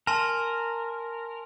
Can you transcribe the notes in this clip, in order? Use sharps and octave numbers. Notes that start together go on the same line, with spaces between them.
A#4 G#5 A5 C6